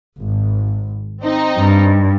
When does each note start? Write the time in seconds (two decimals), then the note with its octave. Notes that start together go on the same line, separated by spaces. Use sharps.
0.19 G#1
1.23 C4 D#4
1.57 G2